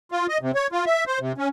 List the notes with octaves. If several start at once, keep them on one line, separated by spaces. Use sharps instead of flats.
F4
D#5
C3
C#5
F4
E5
C5
C3
C#4